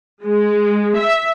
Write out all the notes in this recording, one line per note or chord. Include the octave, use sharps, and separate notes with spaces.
G#3
E5